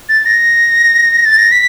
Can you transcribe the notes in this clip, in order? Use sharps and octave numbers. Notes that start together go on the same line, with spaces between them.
A6
A#6
A6
A#6
B6